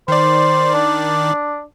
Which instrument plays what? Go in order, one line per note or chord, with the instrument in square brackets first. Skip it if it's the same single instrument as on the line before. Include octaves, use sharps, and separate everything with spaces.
[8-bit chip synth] D#3 D5 [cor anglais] C5
[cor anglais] D4